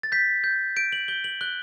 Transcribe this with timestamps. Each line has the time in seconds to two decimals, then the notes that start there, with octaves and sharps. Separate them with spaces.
0.03 A6
0.12 G6 B6
0.44 G6
0.76 G6 D7
0.92 F#7
1.08 G6 G7
1.24 F#7
1.41 F#6 G7